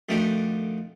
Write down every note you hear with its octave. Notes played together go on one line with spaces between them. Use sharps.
F2 D#3 A3 D4 F#4 G4